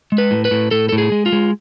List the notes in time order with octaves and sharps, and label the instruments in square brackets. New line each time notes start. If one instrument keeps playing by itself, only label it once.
[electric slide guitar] G#3
B4
A2
B4
A2
A2 A4
A2 A4
G#4
G#3
F4
G#3